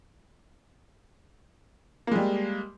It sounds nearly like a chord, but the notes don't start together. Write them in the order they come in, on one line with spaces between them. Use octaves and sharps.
A#3 G#3 G3